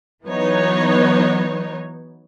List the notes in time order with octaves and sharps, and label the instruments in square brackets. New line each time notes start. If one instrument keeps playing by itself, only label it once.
[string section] E3 F#3 B3 D#4 C#5